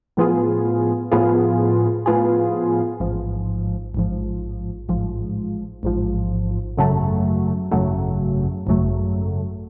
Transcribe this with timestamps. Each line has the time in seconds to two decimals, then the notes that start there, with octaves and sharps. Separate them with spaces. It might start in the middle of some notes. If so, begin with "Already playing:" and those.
0.17 A2 F3 B3 F4 G#4
1.12 A2 F3 B3 F4 G#4
2.06 A2 F3 B3 F4 G#4
3.00 A1 G#2 F3
3.94 A1 G#2 F3
4.89 A1 G#2 F3
5.83 A1 G#2 F3
6.77 G#1 F#2 C#3 F#3 A3
7.72 G#1 F#2 C#3 F#3 A3
8.67 G#1 F#2 C#3 F#3 A3